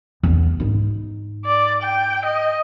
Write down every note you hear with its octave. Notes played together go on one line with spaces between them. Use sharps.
E2 B3
G#2 D#4
D5
G5
D#5